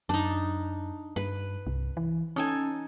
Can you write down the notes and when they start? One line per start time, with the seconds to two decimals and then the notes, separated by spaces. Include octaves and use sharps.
0.09 F#2 D4 D#4
1.16 G2 B4
1.67 C2
1.97 E3
2.36 C#4 D#4 A4 G#5